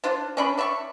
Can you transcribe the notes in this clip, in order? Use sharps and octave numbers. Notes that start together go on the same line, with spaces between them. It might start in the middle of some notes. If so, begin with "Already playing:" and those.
D4 F4 C5
C#4 D4 B5
D5 E5 B5 C#6